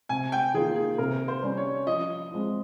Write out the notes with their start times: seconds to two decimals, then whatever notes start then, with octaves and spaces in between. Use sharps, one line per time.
0.09 C3 G#5
0.32 G5
0.54 D#3 A#3 F4 G#4
0.76 G#4
0.98 C3 A#4
1.28 C5
1.43 G3 C#4
1.57 C#5
1.86 F3 D#5
2.31 G#3 C4 F4